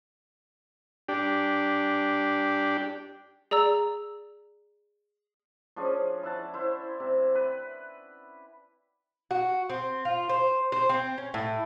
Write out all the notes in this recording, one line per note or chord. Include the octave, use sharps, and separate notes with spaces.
D4 G4
G#4 D5 A#5 E6
F3 C#4 D4 G#4
E4 E5 F#5 A5
E4 C5
C3
B4
F#4
C4
F4
C5
C5
C4
C#4
A2